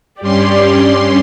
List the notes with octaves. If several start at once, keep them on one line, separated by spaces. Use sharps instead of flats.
G2 C#4 G4 D5 C6